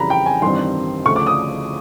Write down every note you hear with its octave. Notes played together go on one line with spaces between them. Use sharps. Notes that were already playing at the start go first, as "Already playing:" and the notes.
Already playing: F2 C#3 E3 G3 A#5 B5
G5
G#5
A1 G2 D#3 G3 C4 C6
D2 C#3 F3 A3 C#6
D6
D#6